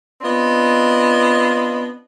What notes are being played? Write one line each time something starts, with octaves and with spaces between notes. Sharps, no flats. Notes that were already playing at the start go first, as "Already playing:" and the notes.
B3 C4 D4 F4 D#5